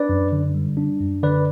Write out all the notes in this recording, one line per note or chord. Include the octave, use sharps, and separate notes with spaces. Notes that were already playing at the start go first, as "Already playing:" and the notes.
Already playing: D4 B4 D5
F#2
D3
G3
D4
F#2
D3 B4 D5